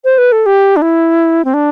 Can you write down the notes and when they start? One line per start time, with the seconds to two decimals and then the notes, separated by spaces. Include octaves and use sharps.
0.04 C5
0.18 B4
0.32 A4
0.46 G4
0.76 D4
0.82 E4
1.45 C4
1.54 D4